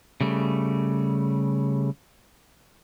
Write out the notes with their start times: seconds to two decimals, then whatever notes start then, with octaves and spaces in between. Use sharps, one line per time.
0.21 C#3 G3 A3